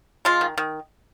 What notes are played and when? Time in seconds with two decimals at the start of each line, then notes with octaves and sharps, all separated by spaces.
0.25 G#3 F4
0.41 D#3
0.58 D#3